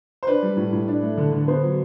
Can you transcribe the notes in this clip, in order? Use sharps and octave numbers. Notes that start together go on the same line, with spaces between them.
C5
D4 B4
G3
A2
A2
D4
A3
D3
D3
B3 C5
F#3